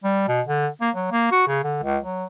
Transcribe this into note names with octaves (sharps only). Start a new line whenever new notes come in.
G3
B2
D3
A#3
F#3
A#3
F#4
C#3
D3
C#2
F#3